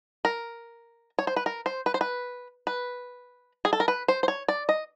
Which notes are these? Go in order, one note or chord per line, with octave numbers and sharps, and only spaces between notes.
A#4
C#5
C5
B4
A#4
C5
B4
C5
B4
B4
G#4
A4
A#4
B4
C5
C5
C#5
D5
D#5